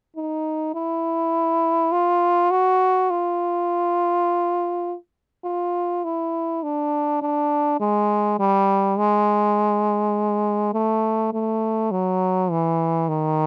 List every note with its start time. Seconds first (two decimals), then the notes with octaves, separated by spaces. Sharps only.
0.16 D#4
0.75 E4
1.92 F4
2.51 F#4
3.10 F4
5.44 F4
6.04 E4
6.63 D4
7.22 D4
7.80 G#3
8.39 G3
8.98 G#3
10.73 A3
11.33 A3
11.91 F#3
12.51 E3
13.09 D#3